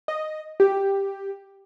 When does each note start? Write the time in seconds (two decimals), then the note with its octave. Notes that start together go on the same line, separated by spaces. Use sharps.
0.08 D#5
0.60 G4